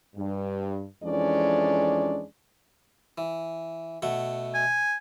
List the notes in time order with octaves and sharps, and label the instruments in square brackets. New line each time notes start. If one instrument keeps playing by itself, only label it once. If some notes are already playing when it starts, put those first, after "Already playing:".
[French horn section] G2
F2 E3 G#3 C#4 D4 D5
[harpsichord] E3
B2 A3 F#5
[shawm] G#5